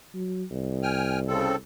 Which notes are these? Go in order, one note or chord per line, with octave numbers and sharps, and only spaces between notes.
F#3
C2
G5 G#5 F6
C#3 C4 A4